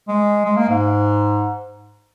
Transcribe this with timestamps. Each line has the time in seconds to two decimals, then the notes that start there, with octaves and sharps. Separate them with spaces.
0.08 G#3
0.45 G#3
0.57 A#3
0.69 G#2